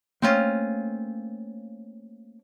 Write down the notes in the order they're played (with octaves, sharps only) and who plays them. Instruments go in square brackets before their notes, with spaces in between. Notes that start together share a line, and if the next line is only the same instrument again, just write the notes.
[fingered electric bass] A3 A#3 [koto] C4 C#4 F4